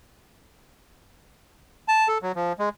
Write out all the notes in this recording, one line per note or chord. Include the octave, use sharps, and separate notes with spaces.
A5
A4
F#3
F3
G#3